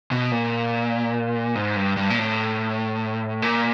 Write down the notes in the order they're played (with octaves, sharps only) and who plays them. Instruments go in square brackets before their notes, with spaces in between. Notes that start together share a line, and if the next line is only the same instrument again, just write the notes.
[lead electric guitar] B2
A#2
G#2
G2
G2
A#2
A2
A#2